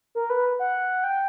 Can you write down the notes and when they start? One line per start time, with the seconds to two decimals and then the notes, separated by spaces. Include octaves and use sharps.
0.15 A#4
0.30 B4
0.59 F#5
1.04 G5